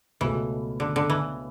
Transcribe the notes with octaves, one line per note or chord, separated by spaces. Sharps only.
C#2 B2 E3 A3
D3
D3
E3